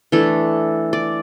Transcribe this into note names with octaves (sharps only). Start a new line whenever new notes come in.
E3 A3 D4 A4
D5